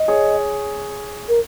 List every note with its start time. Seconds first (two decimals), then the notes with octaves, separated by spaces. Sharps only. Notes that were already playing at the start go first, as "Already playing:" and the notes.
Already playing: D#5
0.08 G#4 C#5
1.29 A#4